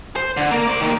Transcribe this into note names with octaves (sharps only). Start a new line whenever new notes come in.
C5
D3
A#3
C5 D5
D#3 A#3